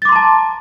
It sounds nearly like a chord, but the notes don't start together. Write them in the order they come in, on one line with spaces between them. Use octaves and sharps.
A6 D6 C6 A#5 A5